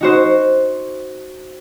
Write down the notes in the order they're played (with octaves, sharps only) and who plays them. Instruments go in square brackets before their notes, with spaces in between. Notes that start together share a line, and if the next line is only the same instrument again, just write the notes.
[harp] D#4 F#4 C5